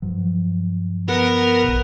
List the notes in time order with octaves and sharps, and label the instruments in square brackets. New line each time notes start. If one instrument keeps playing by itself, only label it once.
[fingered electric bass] G2 F3 F#3
[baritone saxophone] B3 [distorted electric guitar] A#4
[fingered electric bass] A#1 B2